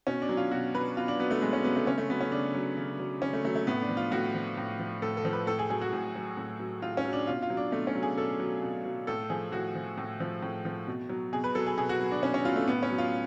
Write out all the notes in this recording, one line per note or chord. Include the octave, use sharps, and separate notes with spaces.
B2 C#4
D4
F#3
F4
B2 F#4
F#3 B4
B2 F4
D4
F#3 B3
A3
B2 G#3
C#4
F#3 B3
A3
C#3 C#4
A3
F#3 B3
C#4
C#3 D4
F#3
C#3
F#3
C#3 C#4
A3
F#3 A3
A3
A2 B3
D4
F3
F4
A2 F#4
F3
A2
F3
A2 A4
A4
F3
B4
A2 A4
G#4
F#3 G#4
F#4
A2
F#3
A2
F#3
A2 F4
C#4
F#3
D4
B2 F4
F4
F#3
D4
B2 A3
C#4
F#3
G#4
B2 A4
F#3
B2
F#3
A2 A4
F3 G#4
A2 F#4
F3
A2
F3
A2
F3
B2
F#3
B2 G#4
B4
F#3 A4
G#4
B2 G#4
F#4
F#3
D4
B2 C#4
C#4
F#3 F4
A3
A2 B3
C#4
F#3
F4